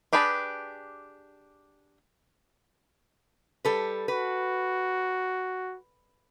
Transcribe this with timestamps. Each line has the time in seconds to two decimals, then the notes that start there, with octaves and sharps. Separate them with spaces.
0.13 D4 G4 G#4 B4 A5
3.65 G3 A4 B4
4.08 F#4 B4